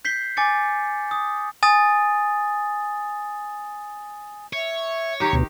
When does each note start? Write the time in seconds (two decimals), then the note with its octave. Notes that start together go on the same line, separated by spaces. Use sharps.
0.05 G6 B6 C7 G7
0.37 G#5 D6 A6 C#7
1.11 D#6
1.63 G#5 D#6 A6
4.53 C#5 E5
5.20 D#3 G4 A#5 D6
5.33 D2 B2